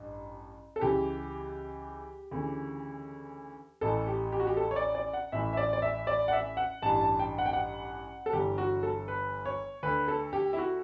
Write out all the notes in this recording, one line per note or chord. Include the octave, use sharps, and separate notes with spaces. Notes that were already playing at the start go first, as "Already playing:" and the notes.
Already playing: A1 G2
A4
C#2 C#3 E3 G4
D2 C#3 E3
A1 A2 E3 A4
G4
G4
F#4
G4
A4
C#5
D5
D5
F#5
A1 A2 E3 E5
E5
D5
D5
E5
D5
F#5
E5
F#5
A1 G2 E3 A5
A5
G5
F#5
G5
F#5
A4
G1 G2 E3 G4
F#4
A4
B4
C#5
D2 D3 B4
A4
G4
E4
F#4